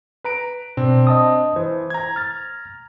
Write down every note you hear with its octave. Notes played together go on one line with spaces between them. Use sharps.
B4 A#5 D7
B2 C4 D4
D#5 A5 D#6
E3 C5
A#5 G#6
F6 A6